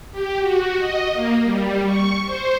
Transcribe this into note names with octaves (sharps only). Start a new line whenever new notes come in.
G4
F#4
D#5
A#3
G3
C#6
C5